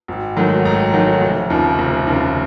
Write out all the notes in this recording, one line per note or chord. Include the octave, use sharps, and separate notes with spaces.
G#1
G#2 D#3 F#3 A3
G#1 A#5
G#2 D#3 F#3 A3
F1
D#2 C#3 F3
F1
D#2 C#3 F3